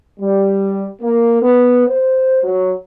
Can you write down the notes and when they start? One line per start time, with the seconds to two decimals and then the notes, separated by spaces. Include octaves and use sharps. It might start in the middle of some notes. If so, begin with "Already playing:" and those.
0.20 G3
1.02 A#3
1.43 B3
1.87 C5
2.43 F#3